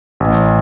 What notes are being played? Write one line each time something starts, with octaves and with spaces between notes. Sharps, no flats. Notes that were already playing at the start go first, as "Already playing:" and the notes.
A1